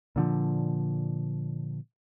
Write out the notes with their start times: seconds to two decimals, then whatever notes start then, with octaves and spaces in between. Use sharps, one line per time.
0.16 A#2 D3 F3